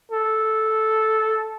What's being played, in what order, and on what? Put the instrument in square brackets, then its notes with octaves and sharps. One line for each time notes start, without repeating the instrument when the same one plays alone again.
[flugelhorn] A4